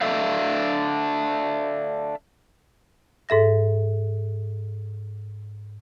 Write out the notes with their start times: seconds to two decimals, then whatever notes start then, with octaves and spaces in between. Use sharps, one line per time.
0.01 D4 A4 E5 F5
3.29 G#2 A4 E5 A#6